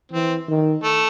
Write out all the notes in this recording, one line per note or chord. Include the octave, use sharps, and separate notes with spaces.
E3 C4
D#3
A3